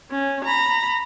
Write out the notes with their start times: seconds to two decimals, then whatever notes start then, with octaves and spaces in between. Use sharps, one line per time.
0.11 C#4
0.45 A#5 B5